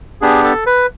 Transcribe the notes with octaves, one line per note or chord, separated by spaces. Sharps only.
B3 D4 G4 G#4
A4
B4